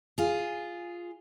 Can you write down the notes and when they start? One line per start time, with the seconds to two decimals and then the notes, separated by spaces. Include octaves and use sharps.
0.18 F4 G#4